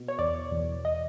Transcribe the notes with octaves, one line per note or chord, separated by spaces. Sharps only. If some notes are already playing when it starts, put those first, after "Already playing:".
Already playing: B2
C#5
E2 D5
E2
D#5